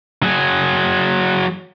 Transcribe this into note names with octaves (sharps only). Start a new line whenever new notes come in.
F#3 G#4